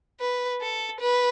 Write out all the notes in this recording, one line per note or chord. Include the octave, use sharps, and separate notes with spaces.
B4
A4
B4